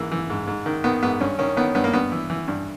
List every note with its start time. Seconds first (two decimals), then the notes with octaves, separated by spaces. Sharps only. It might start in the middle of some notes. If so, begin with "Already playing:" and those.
Already playing: G#2 E3 A#3
0.11 E3
0.30 G#2
0.47 G#2
0.66 D#3
0.84 D#3 B3
1.02 G#2 B3
1.20 G2 C#4
1.39 D#3 C#4
1.57 D#3 B3
1.75 G2 B3
1.84 A#3
1.93 G2 B3
2.12 E3
2.30 E3
2.48 G2